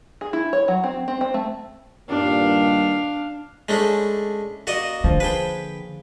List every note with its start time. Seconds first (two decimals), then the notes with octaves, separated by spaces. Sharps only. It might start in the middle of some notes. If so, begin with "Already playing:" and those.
0.21 G#4
0.33 E4
0.53 C#5
0.68 F#3
0.84 C4
1.08 C4
1.21 C4
1.34 A3
2.09 G2 A#2 D#3 D4 F5
3.69 G#3 A3 C#4 D4 E4
4.67 A#3 F#4 D5 D#5
5.04 D3 F3
5.20 D4 G#4 B4 C5 G5